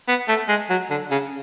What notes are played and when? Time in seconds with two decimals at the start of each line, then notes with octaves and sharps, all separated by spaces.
0.08 B3
0.29 A3
0.49 G#3
0.70 F#3
0.91 D3
1.11 C#3